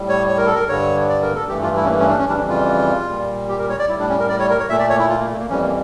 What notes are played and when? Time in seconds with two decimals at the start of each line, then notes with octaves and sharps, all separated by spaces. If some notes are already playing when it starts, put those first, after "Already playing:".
Already playing: A2 G3
0.09 C#5
0.29 C#5
0.38 A#4
0.46 A4
0.55 A#4
0.69 G2 D3 G3 C#5
1.09 D5
1.22 A#4
1.35 A4
1.49 G2 E3 A3 G4
1.62 F4
1.76 E4
1.84 C#4
1.89 A#3
1.99 C#4
2.09 D4
2.18 C#4
2.29 F2 C#3 E3 G3 D4
2.49 F4
3.09 A#2 G3
3.49 G4
3.59 A#4
3.69 C#5
3.79 D5
3.89 A2 G3 E4
3.99 D4
4.09 C#4
4.20 A#4
4.29 D5
4.39 C#5
4.50 A#4
4.59 C#5
4.69 A#2 A3 E5
4.79 D5
4.89 C#5
4.99 E4
5.09 F4
5.19 A#3
5.29 A3
5.39 A#3
5.49 F2 E3 G3 C#4
5.63 A#3